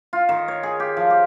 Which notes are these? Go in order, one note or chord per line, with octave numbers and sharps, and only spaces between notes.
F4
D#3
C#5
G#4
G4
F3
G4